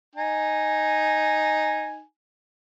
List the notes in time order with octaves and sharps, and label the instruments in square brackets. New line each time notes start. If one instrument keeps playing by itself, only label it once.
[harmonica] D#4 G#5